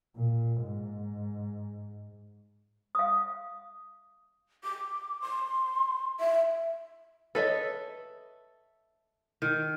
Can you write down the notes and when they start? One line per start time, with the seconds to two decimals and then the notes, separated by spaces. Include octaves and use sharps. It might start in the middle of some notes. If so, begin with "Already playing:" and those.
0.17 A#2
0.63 G#2
2.95 F5 D#6
4.64 D6
5.22 C6
6.20 E5
7.35 A4 B4 C#5 D#5 E5
9.42 D#3